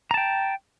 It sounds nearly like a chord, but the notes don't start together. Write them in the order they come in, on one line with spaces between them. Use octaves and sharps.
A#5 A5 G5